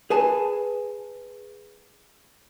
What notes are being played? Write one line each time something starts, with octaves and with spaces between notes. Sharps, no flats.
G#4 B4 G#5 A5